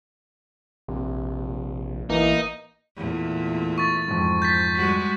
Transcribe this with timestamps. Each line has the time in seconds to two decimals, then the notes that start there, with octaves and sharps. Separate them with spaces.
0.88 A#1 C3
2.10 A1 E3 A#3 D#4
2.97 E2 A#2 A3
3.78 C#6 A6
4.08 F2 G#2
4.42 G6 A6 B6
4.75 G3 G#3 F#4 B6